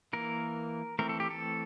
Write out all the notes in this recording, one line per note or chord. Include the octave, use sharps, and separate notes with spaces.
E3 A#3 A#4
E3 A3 C4 A#4
A4
G4
A4